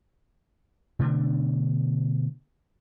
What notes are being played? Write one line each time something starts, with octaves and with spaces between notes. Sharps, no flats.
B2 D3 A3 D4